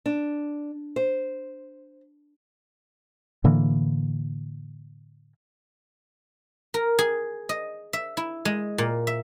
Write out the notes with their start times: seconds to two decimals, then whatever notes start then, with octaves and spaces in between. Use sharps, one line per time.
0.06 D4
0.96 C5
3.44 A2 D3 E3 A#3
6.74 A#4
6.99 G#4
7.49 D#5
7.93 E5
8.17 E4
8.45 G#3
8.78 A#2
9.07 E5